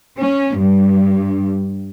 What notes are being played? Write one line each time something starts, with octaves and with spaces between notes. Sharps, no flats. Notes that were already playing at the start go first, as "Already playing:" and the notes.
C#4
G2